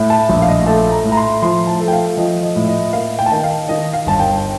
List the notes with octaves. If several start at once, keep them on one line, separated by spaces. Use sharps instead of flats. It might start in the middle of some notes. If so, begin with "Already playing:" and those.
Already playing: A2
A5
A#1
F5
D#5
A3 A5
A#5
A2
A#5
C6
F3 C6
A5
A3
G5
F5
F3 D#5
D#5
A2
D#5
A#3 F5
G5
A5
D#3 G5
F5
D#3 D#5
F5
G1 A5
G5